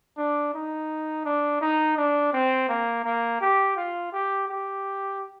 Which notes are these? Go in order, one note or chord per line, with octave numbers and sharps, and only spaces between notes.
D4
D#4
D4
D#4
D4
C4
A#3
A#3
G4
F4
G4
G4